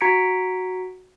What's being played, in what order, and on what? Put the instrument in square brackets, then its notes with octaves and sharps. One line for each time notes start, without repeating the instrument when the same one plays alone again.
[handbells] F#4 A#5 G#6 B6 C#7 D7